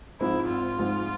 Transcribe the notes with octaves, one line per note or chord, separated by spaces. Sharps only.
G#2 F3 G#3 C4 E4
G#1 F4
G#2 F3 G#3 C4